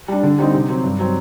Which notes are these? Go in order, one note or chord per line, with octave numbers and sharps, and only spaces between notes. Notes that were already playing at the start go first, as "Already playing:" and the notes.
G3 D4
D3
G3 C4 D#4
C3
F#3 C4
G2
F#3 C4